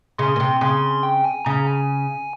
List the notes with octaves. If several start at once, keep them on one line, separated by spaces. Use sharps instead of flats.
C#3 C6
A#2
C3
C#3 C6
G5
G#5
C#3 A#5
G#5